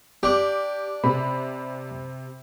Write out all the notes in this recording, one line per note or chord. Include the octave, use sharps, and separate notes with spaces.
D4 G4 D6
C3 B5